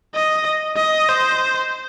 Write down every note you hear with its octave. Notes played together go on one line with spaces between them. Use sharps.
D#5
D#5
C5